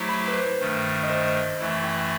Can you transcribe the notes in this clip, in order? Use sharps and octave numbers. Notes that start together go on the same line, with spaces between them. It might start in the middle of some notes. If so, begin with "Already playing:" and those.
Already playing: F#3 A3 E4 G4 C5
B5
B4
C5
G2 D#3 A3
D#5
C5
F#2 E3 A3 E4 E5
G5